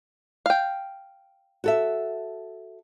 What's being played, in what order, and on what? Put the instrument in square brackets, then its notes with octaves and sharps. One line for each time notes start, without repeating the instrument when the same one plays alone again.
[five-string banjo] F5 G5
[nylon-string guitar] F#4 A4 E5